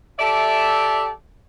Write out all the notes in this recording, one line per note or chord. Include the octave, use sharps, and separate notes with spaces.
G4 A4 D5 E5